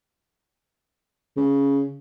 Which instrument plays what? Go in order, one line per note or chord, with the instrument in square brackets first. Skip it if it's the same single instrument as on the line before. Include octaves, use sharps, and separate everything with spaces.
[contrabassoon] C#3